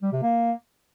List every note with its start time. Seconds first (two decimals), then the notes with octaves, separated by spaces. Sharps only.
0.02 G3
0.12 C3
0.22 A#3